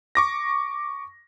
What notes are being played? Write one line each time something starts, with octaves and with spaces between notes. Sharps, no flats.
C#6 D6 A#6